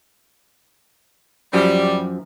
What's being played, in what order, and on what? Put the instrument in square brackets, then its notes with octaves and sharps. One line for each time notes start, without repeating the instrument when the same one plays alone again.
[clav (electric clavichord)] F#2 F3 [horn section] G3